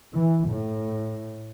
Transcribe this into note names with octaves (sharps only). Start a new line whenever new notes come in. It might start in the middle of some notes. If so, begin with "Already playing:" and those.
E3
A2